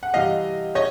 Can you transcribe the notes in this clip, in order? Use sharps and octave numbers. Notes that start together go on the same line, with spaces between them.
F#5
C3 E3 G3 D#5 F5
C#5 D#5